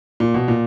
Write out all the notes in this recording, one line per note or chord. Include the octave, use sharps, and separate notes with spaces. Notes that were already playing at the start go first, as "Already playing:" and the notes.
A#2
B2
A#2